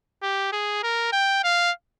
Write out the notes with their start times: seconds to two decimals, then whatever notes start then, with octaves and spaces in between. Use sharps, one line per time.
0.23 G4
0.52 G#4
0.83 A#4
1.13 G5
1.44 F5